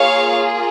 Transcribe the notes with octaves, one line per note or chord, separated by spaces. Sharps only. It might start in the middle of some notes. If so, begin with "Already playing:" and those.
Already playing: A#3 F4 G#4 C#5 F5